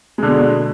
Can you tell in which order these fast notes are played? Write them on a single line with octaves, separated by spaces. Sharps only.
G#3 D3 B2